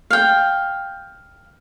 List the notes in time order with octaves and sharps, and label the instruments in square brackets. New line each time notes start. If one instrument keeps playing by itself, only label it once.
[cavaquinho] F5 G5